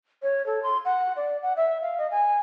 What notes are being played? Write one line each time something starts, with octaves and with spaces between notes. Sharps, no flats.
C#5
A4
C6
F#5
D5
F#5
E5
F5
D#5
G#5